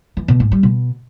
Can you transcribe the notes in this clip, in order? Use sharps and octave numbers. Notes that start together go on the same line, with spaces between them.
E3
B2
G#2
G3
B2